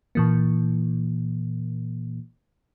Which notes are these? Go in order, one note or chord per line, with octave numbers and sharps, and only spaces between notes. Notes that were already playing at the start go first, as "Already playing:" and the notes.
A#2 E3 A#3